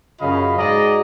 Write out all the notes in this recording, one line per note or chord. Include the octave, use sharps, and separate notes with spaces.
F#2 C#3 F4 D#5 F5 B5
G#2 F#4 G#4 D5 D#5 A#5